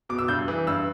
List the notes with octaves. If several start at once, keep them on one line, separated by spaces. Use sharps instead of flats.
B2 D6
E6
G2 G6
E3
G2 E6